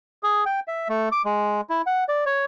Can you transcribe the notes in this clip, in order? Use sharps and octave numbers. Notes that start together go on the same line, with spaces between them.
G#4
G5
E5
A3
D6
G#3
E4
F#5
D5
C#5